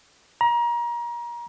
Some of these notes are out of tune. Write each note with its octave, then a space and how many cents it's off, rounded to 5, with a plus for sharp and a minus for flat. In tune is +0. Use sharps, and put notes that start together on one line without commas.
A#5 +30